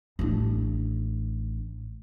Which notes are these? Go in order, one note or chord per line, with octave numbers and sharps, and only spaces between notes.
A1 D4